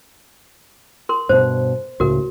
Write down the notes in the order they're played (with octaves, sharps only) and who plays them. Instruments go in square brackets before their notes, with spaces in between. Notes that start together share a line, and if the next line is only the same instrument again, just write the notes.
[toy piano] A#4 C6
[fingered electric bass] G2 B2 [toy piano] C5
[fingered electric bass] C#2 A2 C#3 [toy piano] F#4 A#4